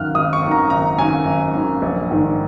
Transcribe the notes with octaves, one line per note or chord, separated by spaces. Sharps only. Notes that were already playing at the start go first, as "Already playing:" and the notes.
Already playing: G#1 F#2 D#3 F6 F#6
G#1 D#6
C#6
F#2 D#3
A#5
G#1 A#5
F#2 D#3 G#5
G#1
F#2 D#3
A#1
G#2 D#3